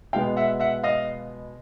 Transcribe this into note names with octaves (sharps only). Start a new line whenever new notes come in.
B2 G#3 B3 F5 G5
E5 F#5
E5 F#5
D#5 F5